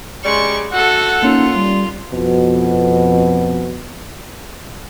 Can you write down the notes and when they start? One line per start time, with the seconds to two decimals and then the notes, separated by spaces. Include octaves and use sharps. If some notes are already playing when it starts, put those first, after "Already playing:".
0.25 C#3 G3 G#3 D5 C#6
0.72 A3 F#4 A4 F#5
1.23 A#3 C#4 D#4 F4
1.54 G3
2.13 F2 B2